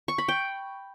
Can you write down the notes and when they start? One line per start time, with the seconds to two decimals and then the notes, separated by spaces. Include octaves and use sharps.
0.08 C#6
0.18 B5
0.28 G5